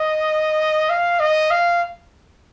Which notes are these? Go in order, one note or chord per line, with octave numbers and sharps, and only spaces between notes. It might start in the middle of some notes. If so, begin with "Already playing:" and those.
Already playing: D#5
F5
D#5
F5